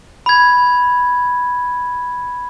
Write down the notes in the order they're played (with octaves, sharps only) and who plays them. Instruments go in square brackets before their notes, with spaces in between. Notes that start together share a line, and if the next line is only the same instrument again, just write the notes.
[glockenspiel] B5 G#6